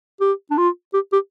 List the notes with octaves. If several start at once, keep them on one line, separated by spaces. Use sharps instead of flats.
G4
D4
F4
G4
G4